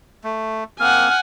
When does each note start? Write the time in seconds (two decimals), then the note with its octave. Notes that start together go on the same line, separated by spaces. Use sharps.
0.24 A3
0.80 A#3 C4 F#5 G#5 F6